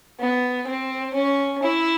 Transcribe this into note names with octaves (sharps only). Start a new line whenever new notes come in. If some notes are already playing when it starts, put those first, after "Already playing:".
B3
C4
C#4
E4